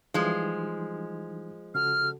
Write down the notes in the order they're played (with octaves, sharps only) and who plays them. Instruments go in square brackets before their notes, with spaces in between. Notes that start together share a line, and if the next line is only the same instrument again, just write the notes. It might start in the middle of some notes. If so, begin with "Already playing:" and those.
[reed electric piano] E3 G3 D#4 [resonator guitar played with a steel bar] F3 G#3
[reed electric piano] C#3 F#4 A4 [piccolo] F6